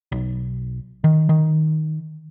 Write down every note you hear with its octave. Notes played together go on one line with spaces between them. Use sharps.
B1
D#3
D#3